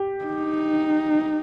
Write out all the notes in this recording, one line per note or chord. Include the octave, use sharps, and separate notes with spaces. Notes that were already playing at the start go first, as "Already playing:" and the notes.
Already playing: G4
D#4